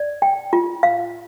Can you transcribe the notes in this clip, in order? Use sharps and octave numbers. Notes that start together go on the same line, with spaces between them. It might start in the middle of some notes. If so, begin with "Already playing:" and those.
Already playing: D5
G5
F4
F5